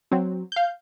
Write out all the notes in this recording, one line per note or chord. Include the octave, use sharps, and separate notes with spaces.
F#3 C4
F5 G6